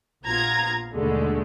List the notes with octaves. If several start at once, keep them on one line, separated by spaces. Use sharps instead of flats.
A#1 B3 F4 A#5 G#6
D#2 B2 D3 G#3 A3